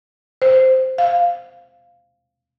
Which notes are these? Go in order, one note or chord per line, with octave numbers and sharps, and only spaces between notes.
C5
F5